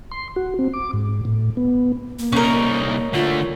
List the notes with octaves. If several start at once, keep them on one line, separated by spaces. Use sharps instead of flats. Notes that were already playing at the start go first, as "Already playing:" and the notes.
C6
F#4
C4
D6
G#2
A2
B3
A#3
C2 C#4 D#4 A#4
D3 A3 F4